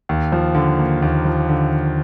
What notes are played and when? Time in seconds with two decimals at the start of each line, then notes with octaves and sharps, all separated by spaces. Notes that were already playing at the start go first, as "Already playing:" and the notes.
0.09 D#2
0.32 F3
0.55 D3
0.78 A#3
1.02 D#2
1.25 F3
1.49 D3